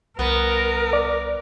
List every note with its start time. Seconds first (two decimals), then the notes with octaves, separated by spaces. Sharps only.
0.19 C2 B3 A#4
0.93 D5